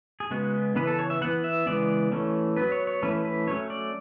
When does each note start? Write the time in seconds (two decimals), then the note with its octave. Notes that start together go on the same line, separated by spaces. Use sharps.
0.20 G#4
0.31 C#3 G#3 B3 F#4
0.75 C#3 E3 B3 B4
0.87 A4
0.99 C#5
1.10 E5
1.21 E3 B3 F#5
1.44 E5
1.66 C#3 E3 G#3 B3 D5
2.12 E3 A3 C#4
2.56 F#3 B3 B4
2.72 C#5
2.87 C#5
3.02 E3 A3 C#4 B4
3.25 B4
3.47 F#3 A3 C#4 C#5
3.70 D5